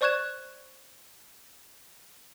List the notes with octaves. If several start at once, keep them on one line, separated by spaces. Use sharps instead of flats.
C5 D5 C#6 F#6 G#6 E7